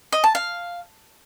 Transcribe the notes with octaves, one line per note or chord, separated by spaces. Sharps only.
D#5
A5
F5